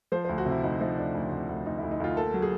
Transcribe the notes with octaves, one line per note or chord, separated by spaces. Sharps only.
F3 C5
D2 C5
F#4
C3 E4
D2 D#4
F3 D#4
D2 D4
D2
C3
D2
D2 D#4
D2 E4
D#4
D2 F4
A#3 A4
F#3
G#4